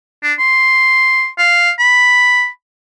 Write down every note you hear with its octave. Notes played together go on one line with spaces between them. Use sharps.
D4
C6
F5
B5